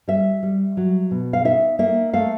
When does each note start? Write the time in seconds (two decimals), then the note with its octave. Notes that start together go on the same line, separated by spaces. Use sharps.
0.08 G3 E5
0.43 G3
0.77 F#3
1.11 B2
1.33 F5
1.45 D#4 E5
1.79 A#3 E5
2.13 A3 F5